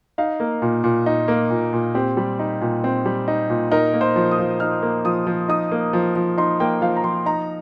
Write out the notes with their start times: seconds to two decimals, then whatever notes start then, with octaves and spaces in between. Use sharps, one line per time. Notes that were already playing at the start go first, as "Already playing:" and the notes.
0.18 D#4 F5
0.40 A#3
0.62 A#2
0.84 A#2
1.06 D#4
1.28 A#3
1.50 A#2
1.73 A#2
1.94 C4 G4
2.17 G3
2.39 D#4
2.61 A#2
2.84 C4
3.05 G3
3.28 D#4
3.50 A#2
3.71 D#4 A#4
3.93 A#3
4.01 C5
4.16 F3
4.31 D#6
4.39 F3
4.60 D#4 F6
4.82 A#3
5.05 F3 D#6
5.27 F3
5.49 D#4 D#6
5.72 A#3
5.93 F3
6.16 F3
6.38 D#4 C6
6.60 A#3 G5
6.81 F3 F5
6.96 A#5
7.04 F3 C6
7.26 D#4 A#5